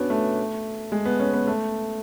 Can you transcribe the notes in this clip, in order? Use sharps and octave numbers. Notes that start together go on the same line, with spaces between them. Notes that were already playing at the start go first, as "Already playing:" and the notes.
Already playing: B3 C#4 D4 F#4
A3
G#3
B3
C#4
B3
A3